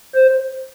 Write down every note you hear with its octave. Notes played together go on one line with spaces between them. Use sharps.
C5